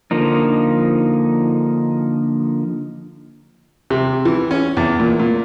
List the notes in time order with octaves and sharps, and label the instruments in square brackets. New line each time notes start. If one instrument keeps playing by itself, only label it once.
[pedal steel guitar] D3 F3 A#3 D#4
[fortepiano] C3
E3
C#4
E2
A#2
A#2